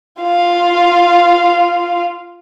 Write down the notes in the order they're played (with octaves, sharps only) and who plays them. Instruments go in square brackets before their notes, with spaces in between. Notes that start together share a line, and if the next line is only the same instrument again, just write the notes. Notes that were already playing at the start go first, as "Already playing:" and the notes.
[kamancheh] F4 F5